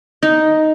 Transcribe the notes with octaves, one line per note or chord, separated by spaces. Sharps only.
D#4